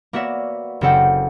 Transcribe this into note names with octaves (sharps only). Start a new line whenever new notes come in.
A#3 B3 F#4 C#5 D5 E5
F#1 F#3 C4 A4 F#5 G5